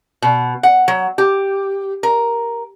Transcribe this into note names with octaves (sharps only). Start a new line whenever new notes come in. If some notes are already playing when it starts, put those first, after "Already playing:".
B2
F#5
F#3
G4
A#4